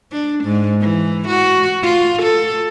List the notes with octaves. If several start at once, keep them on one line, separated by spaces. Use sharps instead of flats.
D4
G#2
E3
F#4
F4
A4